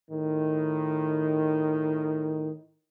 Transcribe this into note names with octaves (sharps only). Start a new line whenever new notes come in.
A2 D#3